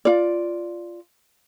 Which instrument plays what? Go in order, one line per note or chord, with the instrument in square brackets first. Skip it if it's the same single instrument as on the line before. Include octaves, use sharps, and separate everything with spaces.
[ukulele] F4 D5